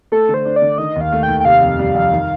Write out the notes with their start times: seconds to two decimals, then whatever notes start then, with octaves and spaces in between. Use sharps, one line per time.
0.12 A3 A4
0.29 D3
0.34 C5
0.45 D4
0.56 D5
0.62 D3
0.78 D#3 D#5
0.96 D#2 F5
1.12 A3
1.23 G5
1.28 D#2
1.40 G5
1.45 C3 F5
1.61 F2
1.79 G3
1.95 F2
2.12 D#3